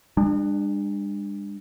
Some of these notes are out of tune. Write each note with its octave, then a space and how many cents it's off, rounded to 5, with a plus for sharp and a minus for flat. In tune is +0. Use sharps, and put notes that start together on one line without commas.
G#3 -45 D4 +20